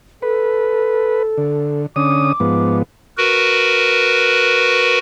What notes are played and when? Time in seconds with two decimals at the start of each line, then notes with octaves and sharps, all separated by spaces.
0.22 A4 B4
1.38 D3
1.96 D3 C#4 D6 D#6
2.40 G#2 F3 B3
3.18 F#4 A#4 B4